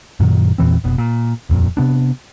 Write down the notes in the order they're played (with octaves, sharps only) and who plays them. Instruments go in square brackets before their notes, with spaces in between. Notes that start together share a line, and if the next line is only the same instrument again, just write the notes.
[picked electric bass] F#2 A#2 D#3 F#3
E2 A#2 E3 C4
F1 B2
A#2
D#1 F2 A#2
C3 B3 D4